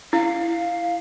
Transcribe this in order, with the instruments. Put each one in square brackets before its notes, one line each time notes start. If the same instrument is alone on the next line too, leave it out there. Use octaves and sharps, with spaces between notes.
[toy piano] E4 [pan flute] F5